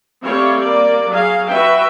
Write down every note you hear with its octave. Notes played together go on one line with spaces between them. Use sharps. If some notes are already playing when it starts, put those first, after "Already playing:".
G3 A3 C4 G4 C#5 F5
A#3 D5
F#3 G#4 F5
F#4 B4 E5 G5